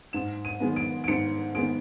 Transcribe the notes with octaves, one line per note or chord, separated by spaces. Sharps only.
G#2 E7
D#7
D#3 G#3 B3
D7
D7
G#2 C#7
D#3 G#3 B3 D7